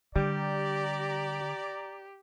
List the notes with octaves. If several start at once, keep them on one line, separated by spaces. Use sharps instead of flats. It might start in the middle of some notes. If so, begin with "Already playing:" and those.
D3 G3 G4 D5 A#5